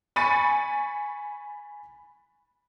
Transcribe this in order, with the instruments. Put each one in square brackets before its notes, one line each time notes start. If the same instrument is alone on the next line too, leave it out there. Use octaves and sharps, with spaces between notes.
[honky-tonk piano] G#5 B5 C#6 A6 C#7 D#7